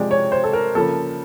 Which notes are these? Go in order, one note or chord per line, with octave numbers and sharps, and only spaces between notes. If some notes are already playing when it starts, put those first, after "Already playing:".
Already playing: C3 F3 G#3 D5
C#5
C5
A4
A#4
C#3 F3 A#3 A4